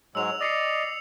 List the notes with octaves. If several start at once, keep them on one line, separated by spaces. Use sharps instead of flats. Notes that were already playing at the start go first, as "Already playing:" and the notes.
G#2 F#3 G#3 E6 F7
D5 D#5 D#6 C7 C#7